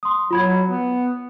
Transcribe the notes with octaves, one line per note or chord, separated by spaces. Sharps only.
C6 D#6
F#3 F4 B5 G#6
B3